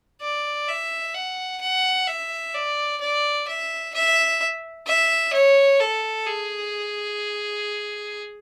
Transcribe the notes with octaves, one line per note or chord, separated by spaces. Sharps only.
D5
E5
F#5
F#5
E5
D5
D5
E5
E5
E5
C#5
A4
G#4